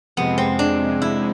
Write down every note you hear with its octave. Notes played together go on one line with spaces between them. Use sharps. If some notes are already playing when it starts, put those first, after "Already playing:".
F2 C3 G#3 B3
C4
D4
E4